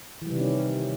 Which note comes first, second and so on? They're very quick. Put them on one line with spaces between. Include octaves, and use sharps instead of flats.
E3 G3 C3 D#3 C#4